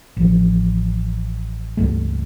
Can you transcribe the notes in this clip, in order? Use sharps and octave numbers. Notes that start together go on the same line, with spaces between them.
A1 F3
C#2 G2 A3